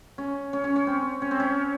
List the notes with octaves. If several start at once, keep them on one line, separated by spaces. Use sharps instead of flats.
C#4
C#4
C#4
C#4
C4
C#4
C4
C#4